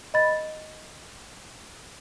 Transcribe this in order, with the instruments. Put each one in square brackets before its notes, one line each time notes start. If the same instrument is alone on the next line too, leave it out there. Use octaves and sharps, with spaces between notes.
[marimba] D#5 B5 A6